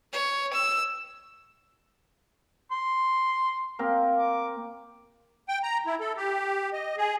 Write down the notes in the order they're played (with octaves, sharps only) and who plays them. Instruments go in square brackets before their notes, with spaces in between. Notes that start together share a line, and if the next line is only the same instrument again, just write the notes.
[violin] C#5
E6
[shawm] C6
[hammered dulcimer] A#3 C4 A#4
[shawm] D6
[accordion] G5
A#5
E4
A4
G4
D#5
G#4